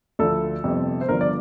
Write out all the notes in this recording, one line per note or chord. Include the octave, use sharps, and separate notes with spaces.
D2 D3 F3 A4
G1 F2 C3
C5
G1 G2 D3 F3 A#4
D5